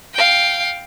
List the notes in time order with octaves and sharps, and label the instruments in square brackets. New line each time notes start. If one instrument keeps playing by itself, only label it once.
[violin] F5 G5